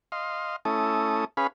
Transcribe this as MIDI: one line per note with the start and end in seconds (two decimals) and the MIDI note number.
0.12 0.56 75
0.12 0.56 77
0.12 0.56 84
0.65 1.25 57
0.65 1.25 61
0.65 1.25 64
0.65 1.25 69
0.65 1.25 87
1.37 1.47 61
1.37 1.47 68
1.37 1.47 71
1.37 1.47 77
1.37 1.47 83